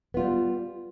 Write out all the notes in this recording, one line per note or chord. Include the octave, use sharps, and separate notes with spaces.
G3 B3 F4